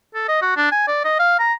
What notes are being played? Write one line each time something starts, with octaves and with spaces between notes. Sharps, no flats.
A4
D#5
F#4
D4
G#5
D5
D#5
F5
A#5